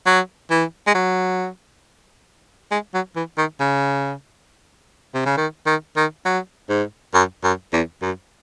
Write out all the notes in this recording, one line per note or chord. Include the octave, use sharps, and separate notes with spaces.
F#3
E3
G#3
F#3
G#3
F#3
E3
D#3
C#3
C3
C#3
D#3
D#3
D#3
F#3
G#2
F#2
F#2
E2
F#2